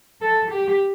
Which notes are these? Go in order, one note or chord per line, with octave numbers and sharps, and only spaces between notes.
A4
G4